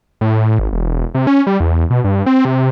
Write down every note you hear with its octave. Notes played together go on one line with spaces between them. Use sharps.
A2
G#1
E1
C3
C#4
G3
E2
B2
G2
C4
C3